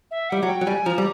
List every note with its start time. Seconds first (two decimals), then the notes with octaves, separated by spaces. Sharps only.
0.11 E5
0.30 G3 F#5
0.42 F#3 F#5
0.49 G5
0.61 F#3
0.67 G3 G#5
0.86 F3 A#5
0.98 G3